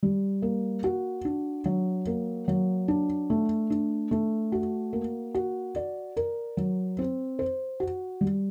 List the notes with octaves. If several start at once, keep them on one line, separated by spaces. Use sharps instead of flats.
G3
A#3
F#4
D4
F#3
A#3
F#3
D4
A3
D4
A3
F#4
A#3
F#4
D5
A#4
F#3
C4
C5
F#4
G3